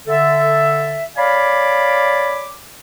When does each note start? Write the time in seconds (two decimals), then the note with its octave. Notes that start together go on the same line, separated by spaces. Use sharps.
0.08 D3 A4 E5
1.17 C#5 D5 F5 G#5 B5 D6